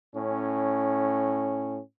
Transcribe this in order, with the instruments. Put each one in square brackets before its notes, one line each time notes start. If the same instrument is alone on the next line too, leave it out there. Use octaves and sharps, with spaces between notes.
[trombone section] A2 C#4